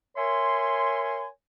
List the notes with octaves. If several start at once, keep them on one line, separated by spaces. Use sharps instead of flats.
A#4 C#5 E5 G#5 C6